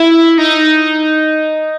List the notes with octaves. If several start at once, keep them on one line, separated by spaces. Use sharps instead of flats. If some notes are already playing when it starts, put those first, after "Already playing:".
Already playing: E4
D#4